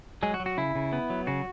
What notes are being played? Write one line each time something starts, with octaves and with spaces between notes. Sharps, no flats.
F#3 G#3 G#4
F#4
F#3
F#4
C#3 E4
C#3
B3
F#3
C#3 F#4